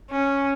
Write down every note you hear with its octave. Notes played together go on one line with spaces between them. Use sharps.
C#4